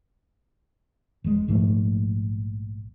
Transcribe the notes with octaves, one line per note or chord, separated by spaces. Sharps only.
E1 G#3
A#1 G#2 F3 A3